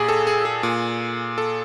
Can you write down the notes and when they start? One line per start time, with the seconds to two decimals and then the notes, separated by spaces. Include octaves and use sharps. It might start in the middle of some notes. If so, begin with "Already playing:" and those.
Already playing: A#2 G4 G#4
0.09 A4
0.27 G#4
0.45 G#4
0.63 A#2
1.38 A4